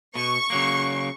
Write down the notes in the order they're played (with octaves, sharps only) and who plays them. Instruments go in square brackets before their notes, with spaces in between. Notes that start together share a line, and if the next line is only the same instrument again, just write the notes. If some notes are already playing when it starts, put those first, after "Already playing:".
[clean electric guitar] B2 [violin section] C#6
[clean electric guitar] C#3 F#3 A#3